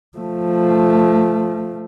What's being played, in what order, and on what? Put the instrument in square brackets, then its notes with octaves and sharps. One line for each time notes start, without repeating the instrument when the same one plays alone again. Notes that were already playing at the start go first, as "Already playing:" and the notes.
[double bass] F3 A3